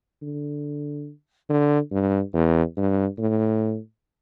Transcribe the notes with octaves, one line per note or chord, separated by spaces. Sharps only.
D3
D3
G2
E2
G2
A2